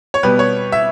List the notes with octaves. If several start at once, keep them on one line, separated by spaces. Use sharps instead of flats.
C#5
B2 G3 B3 B4
C#5
E5